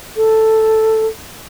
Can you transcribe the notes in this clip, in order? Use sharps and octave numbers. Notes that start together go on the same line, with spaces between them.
A4